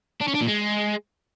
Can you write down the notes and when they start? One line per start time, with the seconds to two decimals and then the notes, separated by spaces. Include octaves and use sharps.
0.21 D4
0.28 C#4
0.35 D4
0.42 A#2
0.48 G#3